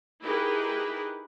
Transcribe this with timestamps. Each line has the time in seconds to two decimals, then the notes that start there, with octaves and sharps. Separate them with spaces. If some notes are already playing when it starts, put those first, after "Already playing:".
0.22 D#4 E4 G4 G#4 A#4 B4